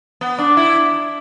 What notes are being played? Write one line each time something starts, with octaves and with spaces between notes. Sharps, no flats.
B3
D4
E4